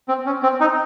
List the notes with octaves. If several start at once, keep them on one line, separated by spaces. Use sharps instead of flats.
C4
C#4
C4
D#4